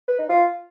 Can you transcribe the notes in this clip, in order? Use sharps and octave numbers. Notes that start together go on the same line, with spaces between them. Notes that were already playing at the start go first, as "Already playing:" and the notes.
B4
D#4
F4